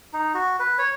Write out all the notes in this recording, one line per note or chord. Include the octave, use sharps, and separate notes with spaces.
D#4
F#4
B4
C#5